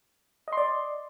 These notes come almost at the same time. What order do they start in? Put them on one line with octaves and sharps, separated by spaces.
D#5 C6 D5